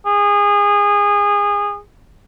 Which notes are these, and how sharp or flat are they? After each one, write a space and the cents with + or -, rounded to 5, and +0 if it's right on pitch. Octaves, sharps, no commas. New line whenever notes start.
G#4 -25